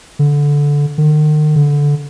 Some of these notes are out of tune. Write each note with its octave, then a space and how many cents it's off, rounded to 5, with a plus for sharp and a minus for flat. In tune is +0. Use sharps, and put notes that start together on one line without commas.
D3 -15
D#3 -40
D3 -15